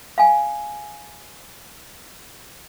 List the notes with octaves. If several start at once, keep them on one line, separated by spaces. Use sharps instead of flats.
F5 G#5